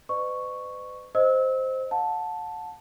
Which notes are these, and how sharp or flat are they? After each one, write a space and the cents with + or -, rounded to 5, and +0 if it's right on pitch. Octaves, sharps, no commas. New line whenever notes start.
B4 +45 D#5 -45 C#6 +0
C5 +0 D#5 +0 E6 -30
F#5 -40 A5 +0